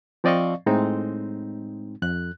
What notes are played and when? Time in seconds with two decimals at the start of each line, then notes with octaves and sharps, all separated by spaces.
0.24 F3 C4 D5 D#5 F5 C#6
0.66 A2 G#3 C4 D#4
2.02 F2 F#6